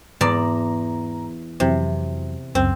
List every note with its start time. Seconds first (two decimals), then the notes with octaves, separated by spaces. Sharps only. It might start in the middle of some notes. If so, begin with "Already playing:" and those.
0.21 E2 G#2 D5 A5 A#5
1.60 F2 C3 E3 F#3
2.55 C#2 F#2 C4